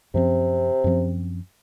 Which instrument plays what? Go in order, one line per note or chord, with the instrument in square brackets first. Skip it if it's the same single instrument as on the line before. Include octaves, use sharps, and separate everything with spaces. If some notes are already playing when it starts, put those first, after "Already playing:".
[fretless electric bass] F#2 F3 C4 [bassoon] C3
[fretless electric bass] F#2 F3 C4